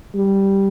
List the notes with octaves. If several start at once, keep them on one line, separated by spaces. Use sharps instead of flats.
G3